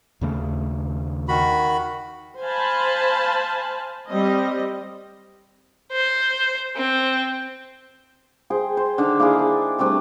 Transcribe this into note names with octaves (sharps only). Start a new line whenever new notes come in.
D#2 C#3 A3
D#3 F#4 B5
C5 F5 G#5 A5 B5
G3 C4 D#5
C5
C4
G#4 C5 G5
C5
D3 D#3 D4
A#3 D4 E4 G#4
A5
G3 A3 C4 D4